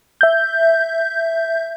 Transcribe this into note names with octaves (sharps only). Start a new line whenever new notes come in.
E5 G6